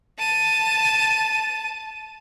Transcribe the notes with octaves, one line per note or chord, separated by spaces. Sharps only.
A5 D#7